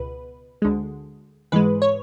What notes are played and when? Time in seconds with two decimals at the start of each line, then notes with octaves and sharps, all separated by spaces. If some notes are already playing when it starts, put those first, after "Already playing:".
Already playing: C#2 B2 B4
0.62 D2 D3 G#3
1.52 G#2 E3 G#3 B4
1.82 C#5